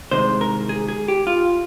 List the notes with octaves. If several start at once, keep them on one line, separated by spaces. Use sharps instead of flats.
C2 C3 D#3 G#3 C5
A#4
G#4
G#4
G4
F4